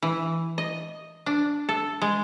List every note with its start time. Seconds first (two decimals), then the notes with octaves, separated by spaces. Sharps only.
0.02 E3
0.58 D#5
1.26 D4
1.69 A4
2.02 G#3